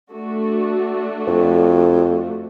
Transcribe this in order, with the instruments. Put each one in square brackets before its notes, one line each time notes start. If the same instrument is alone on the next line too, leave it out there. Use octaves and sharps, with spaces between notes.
[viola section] A3 D4 F#4
[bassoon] F2